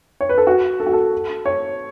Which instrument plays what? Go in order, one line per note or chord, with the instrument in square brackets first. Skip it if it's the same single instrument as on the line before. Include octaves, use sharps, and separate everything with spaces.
[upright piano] C#5
B4
A4
F#4
A4
F#4
A4
C#5